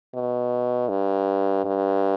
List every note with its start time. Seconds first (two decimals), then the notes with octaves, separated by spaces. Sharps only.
0.14 B2
0.89 G2
1.65 G2